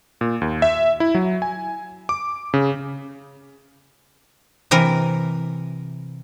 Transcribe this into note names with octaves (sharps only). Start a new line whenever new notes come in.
A#2
D#2
E5
E4
F#3
G#5
D6
C#3
C3 E3 A#4